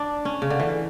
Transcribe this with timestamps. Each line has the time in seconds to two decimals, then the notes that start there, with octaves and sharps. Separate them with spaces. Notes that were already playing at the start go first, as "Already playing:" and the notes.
Already playing: D4
0.25 C#4
0.42 C#3
0.50 D3
0.60 E3